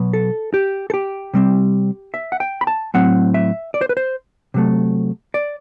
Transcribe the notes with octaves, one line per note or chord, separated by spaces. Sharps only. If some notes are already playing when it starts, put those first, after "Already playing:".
Already playing: B2 F#3 B3
A4
G4
A4
G4
C3 G3 C4
E5
F#5
G5
B5
A5
A2 F#3 C4 F#5
E5
D5
C5
B4
C5
C3 F#3 A3
D5